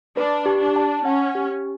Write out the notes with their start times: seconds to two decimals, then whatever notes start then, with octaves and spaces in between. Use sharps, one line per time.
0.17 D4 B4
0.46 G4
0.61 D4
0.76 A5
1.05 C#4 F#5
1.35 G4